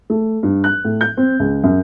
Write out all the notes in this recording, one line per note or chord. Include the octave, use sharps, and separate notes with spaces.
A3
G2
F#6
A2
G6
C4
C#2
F#2